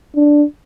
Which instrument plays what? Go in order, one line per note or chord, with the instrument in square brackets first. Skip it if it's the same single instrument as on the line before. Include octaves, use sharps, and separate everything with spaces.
[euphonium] D4